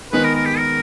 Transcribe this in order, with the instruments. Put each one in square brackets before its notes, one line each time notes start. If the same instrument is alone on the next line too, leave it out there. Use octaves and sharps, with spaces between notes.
[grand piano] D#3 G#3 B3 D#4 G#4 [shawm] B4
[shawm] A#4
A#4
G4
A#4